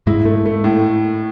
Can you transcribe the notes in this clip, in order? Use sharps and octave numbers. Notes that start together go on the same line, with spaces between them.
G#2 G#3 E4
A3
A3
A2